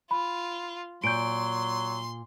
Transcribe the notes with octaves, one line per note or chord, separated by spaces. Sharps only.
F4 B5
A#2 F#3 C6 G6 D7